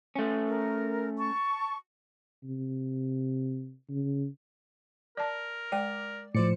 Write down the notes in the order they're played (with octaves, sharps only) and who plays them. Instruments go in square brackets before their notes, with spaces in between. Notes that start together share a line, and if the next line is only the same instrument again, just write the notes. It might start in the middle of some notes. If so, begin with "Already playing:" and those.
[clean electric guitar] A3 C#4
[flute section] A#4
A5 C#6
[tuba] C3
C#3
[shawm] A#4 [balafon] D5 A5
[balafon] G#3 G5 [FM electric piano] D5
[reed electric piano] A2 [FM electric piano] F3 C5 C#7 [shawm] D5